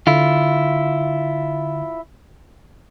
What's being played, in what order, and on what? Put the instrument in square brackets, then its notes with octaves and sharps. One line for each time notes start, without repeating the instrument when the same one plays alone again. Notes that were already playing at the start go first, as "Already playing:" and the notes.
[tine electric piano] D3 [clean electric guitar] E4 F4